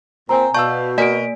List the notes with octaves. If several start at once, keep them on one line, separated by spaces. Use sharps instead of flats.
A#2 C4 G#5 A#5
B2 D5 F5 A5 C#6 E6 G6
A#3 F#4 A#4 D5 D#5 G#5 B6 D7